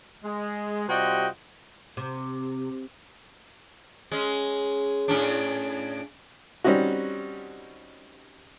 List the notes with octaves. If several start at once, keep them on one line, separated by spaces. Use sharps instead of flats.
G#3
C3 G3 F4 F#4 D#5 G5
C3
G#3 C#4
A2 C#4 D4
G3 C4 C#4 D#4 F#4